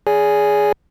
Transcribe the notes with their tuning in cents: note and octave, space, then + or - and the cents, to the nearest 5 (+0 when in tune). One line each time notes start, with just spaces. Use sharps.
G#4 +0 D5 -40 G#5 +0